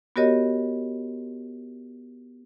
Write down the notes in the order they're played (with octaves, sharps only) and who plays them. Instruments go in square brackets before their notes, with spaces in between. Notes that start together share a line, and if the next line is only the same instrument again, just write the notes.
[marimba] B3 F#4 G4 A#4 C#5 D#5